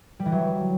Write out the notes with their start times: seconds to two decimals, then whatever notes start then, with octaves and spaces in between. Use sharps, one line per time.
0.20 G3
0.26 E3
0.32 F#3